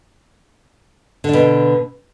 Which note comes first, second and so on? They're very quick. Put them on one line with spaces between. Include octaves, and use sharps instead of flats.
D3 D4 B2